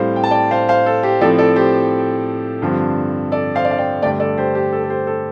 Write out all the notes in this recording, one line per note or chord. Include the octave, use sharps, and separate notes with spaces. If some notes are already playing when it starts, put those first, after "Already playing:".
Already playing: A2 G3 C4 C5 F5
G5
A5
D5 G5
C5 F5
C5 F5
A4
G4 C5
A2 F3 C4 A4 D5
A4 D5
G4 C5
G2 D3 F3 C4
A4 D5
C5 F5
D5
F5
D5 G5
G2 D3 A3 D5 G5
A4 D5
G4 C5
G4
A4
A4
G4 C5
A4